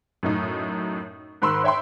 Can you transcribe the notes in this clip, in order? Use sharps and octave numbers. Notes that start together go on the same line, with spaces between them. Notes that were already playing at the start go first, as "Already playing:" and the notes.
F#2 A2 D#4
G#2 D#3 B5 C6 E6
C#5 E5 G5 B5 C6